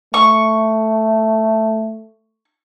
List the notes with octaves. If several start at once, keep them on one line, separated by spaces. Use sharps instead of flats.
A3 C#6